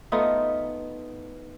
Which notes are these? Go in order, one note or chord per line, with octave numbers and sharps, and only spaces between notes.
A3 B3 D#4 F4